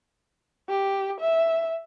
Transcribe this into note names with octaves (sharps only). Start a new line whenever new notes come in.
G4
E5